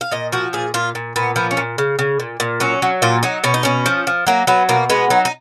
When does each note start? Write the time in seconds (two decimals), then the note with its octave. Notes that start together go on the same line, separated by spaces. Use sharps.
0.01 F5
0.11 A#2 D#5
0.32 F3 F#4
0.53 A#2 G#4
0.74 A#2 F4
0.95 A#2
1.16 A#2 B3
1.36 F3 B3
1.51 C#4
1.57 A#2
1.78 C#3
1.99 C#3
2.20 A#2
2.40 A#2
2.60 F#3 C#4
2.82 F#3
3.02 A#2 F4
3.23 F#3 D#4
3.44 B2 C#4
3.54 D#4
3.63 B2 C#4
3.86 F3
4.07 F3
4.27 F#3 A#3
4.47 F#3 B3
4.69 B2 A#3
4.90 G#3 B3
5.10 F#3 D#4
5.25 D#4